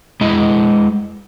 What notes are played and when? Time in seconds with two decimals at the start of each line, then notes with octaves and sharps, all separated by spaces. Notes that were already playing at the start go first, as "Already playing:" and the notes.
0.21 G#3 E4 D#5